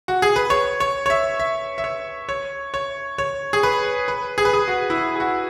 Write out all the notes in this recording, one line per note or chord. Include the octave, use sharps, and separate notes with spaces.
F#4
G#4
B4
C#5
C#5
C#5
E5
E5
E5
C#5
C#5
C#5
C#5
G#4
B4
B4
G#4
B4
G#4
F#4
E4
F#4
G#4
F#4